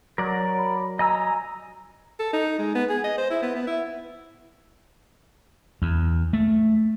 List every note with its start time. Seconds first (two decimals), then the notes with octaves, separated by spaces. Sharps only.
0.18 F#3 A#4 D5
0.59 B5
0.99 D#5 G#5 A#5 E6
2.19 A4
2.33 D#4
2.58 G#3
2.75 B3
2.89 G#4
3.04 D#5
3.18 C5
3.30 E4
3.42 B3
3.55 B3
3.67 E4
5.82 E2
6.33 A3